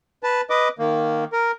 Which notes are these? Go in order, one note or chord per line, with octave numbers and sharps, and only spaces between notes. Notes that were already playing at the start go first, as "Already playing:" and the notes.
B4 A5
B4 D#5 D6
D#3 A#3
A#4